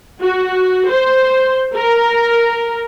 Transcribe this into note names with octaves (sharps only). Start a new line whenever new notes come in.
F#4
C5
A#4